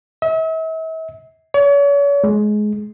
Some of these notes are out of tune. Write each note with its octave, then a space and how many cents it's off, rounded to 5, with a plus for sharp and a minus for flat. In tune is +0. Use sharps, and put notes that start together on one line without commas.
E5 -40
C#5 +40
G#3 +20